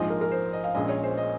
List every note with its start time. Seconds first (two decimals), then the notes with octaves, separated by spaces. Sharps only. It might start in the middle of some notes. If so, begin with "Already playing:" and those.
Already playing: A#1 G#2 F3 G#3 D#5
0.10 A#4
0.21 A#4
0.31 C5
0.53 D#5
0.64 F5
0.74 A#1 A#2 G#3 C#4 D#5
0.89 C#5
1.03 C5
1.17 D#5